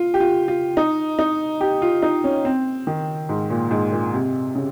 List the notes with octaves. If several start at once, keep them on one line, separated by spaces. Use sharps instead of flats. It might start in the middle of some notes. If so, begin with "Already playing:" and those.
Already playing: F4
G4
F4
F4
D#4
D#4
G4
F4
D#4
C#4
C4
D#3
G#2
A#2
G#2
A#2
C3
C#3